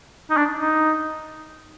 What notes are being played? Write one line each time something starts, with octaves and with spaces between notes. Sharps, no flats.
D#4
D4
D#4